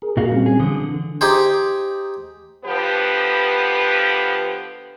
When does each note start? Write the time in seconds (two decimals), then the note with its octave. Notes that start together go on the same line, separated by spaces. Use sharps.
0.02 G#4 A#4
0.17 A#2 F#4 F5
0.32 G3 C4 C#4
0.46 G#4
0.60 D3 E3 D#6 G6
0.77 E3
1.21 D#4 G4 G#4 C5
2.65 D3 F3 B3 G4 B4